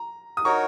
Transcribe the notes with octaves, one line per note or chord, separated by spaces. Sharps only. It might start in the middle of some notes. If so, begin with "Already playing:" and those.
Already playing: A#5
D#6
D#4 F#4 A#4 C#5 A#5 C#6